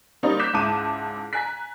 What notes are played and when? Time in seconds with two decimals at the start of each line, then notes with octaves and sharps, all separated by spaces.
0.23 G3 A#3 C#4 D#4 C5 D5
0.39 D6 F#6 G6 B6 E7
0.53 C#2 G#2 E4 A5 D6 D#7
1.33 G#5 A#5 F#6 B6